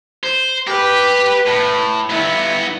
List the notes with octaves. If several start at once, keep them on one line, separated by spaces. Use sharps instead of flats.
C5
G4 B4
A2
G2 B3 E4